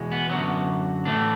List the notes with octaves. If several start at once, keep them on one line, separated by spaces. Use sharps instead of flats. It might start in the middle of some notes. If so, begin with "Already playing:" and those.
Already playing: E2 B2 G#3
B3
F#2 D3 F#3 B3
A2 E3 A3 D4